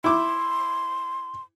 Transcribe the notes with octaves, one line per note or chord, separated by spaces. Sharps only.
E4 C6 D6